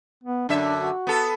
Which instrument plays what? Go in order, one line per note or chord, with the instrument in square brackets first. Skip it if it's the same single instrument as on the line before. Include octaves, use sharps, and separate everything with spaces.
[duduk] B3
[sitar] F#2 D3 E5 [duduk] D4
[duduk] F#4
[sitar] B3 A4